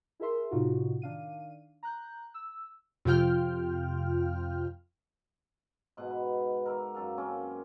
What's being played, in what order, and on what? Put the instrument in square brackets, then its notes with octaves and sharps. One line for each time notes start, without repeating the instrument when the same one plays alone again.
[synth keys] E4 G#4 A#4 E5 C6
A2 C3 D#4 F4 F#4
D#3 D4 F5 D#7
A#5 F#6 G6
E6
[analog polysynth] F2 C3 F4 G5 F6
[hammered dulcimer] G#2 B2 F#5
B4
A#4 E5 D6
F#2 A4 F5
A#3 C4 C#4